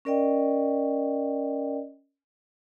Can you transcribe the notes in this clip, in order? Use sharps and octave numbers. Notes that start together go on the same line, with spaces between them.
C#4 A#4 D5 D#5 G5